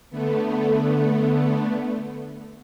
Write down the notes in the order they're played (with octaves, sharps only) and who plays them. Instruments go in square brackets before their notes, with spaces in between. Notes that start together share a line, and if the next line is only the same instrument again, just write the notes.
[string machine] D3 A3 B3